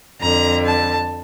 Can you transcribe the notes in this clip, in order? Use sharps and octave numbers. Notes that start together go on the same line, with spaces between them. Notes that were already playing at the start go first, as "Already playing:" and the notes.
F2 D3 A#5
A5